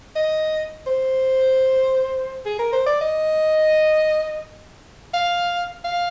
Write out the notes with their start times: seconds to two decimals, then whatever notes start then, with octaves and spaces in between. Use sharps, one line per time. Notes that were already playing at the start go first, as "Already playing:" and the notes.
0.15 D#5
0.86 C5
2.45 G#4
2.59 A#4
2.72 C5
2.86 D5
3.01 D#5
5.14 F5
5.85 F5